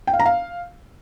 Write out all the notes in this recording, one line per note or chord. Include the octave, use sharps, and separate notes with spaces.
G5
F5
A#5
F5